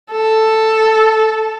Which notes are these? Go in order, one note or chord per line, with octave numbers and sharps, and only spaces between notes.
A4